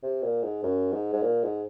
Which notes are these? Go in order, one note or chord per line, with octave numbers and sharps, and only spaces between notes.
C3
A#2
G#2
F#2
G#2
G#2
A#2
G#2